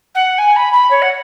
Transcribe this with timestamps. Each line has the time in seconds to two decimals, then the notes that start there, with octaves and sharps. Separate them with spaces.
0.14 F#5
0.38 G#5
0.56 B5
0.73 B5
0.90 C#5
1.02 F#5